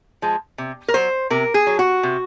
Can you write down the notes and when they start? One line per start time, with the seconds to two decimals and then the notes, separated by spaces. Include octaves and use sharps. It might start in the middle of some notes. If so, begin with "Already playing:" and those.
0.22 F3 G#3
0.58 C3
0.88 A#4
0.94 F#3 C5
1.30 C3 A#4
1.54 G#4
1.67 F#3
1.79 F#4
2.03 C3